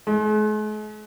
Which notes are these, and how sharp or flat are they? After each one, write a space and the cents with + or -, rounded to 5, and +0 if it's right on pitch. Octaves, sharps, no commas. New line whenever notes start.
G#3 +45